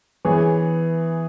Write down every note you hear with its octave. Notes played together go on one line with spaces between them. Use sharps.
E3 B3 G#4 C#5